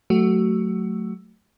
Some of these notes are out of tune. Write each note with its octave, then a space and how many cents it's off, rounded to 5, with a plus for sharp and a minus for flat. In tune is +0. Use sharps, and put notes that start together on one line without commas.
F#3 +0 A3 +0 F#4 +20